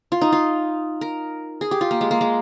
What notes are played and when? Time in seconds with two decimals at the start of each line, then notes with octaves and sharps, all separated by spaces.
0.12 F4
0.21 D#4
0.32 F4
1.01 A#4
1.61 G#4
1.71 G4
1.81 F4
1.91 A#3
2.01 G#3
2.11 A#3
2.21 G#3